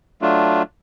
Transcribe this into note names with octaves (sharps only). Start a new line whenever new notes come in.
F#3 A3 D4 F4